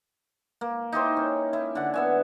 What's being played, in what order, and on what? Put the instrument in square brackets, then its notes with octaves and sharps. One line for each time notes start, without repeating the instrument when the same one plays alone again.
[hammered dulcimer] A#3
D#4 E4 G4 C5
C#4
E4
D3 F#5
B3 E5 G#5